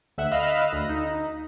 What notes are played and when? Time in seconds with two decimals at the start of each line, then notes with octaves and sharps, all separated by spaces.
0.18 D2 E5 F#5
0.31 D#5 F5 B5 E6 F#6
0.73 D2 A#6
0.89 D#4